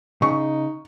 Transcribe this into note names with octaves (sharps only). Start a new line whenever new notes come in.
C#3 D#4 C#6